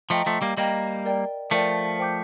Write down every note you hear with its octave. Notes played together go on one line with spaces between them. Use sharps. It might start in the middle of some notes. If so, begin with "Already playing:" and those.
F3 A3 D#5 G5 A#5
F3 A3
G3 A#3
G3 A#3 D#5 G5 A#5
A#4 D5 G5
F3 A3 A#4 D5 G5
C5 G5 D6 G6